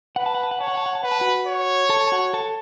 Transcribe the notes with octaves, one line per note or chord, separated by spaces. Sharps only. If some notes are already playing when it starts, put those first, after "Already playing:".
B4 F#5
A5
F#5
A5
F#5
C#5 A5
F#5
A5
F#5
A5
B4 F#5
A5
F#4 F#5
C#5
A4 A5
A5
F#4 F#5
A4 A5